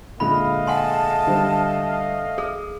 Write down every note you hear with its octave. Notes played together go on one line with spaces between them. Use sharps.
A#2 D3 G#3 A3 D#5 F5 B5
F#5 G#5 A5 C6
D3 G3 C5
G#4 D#6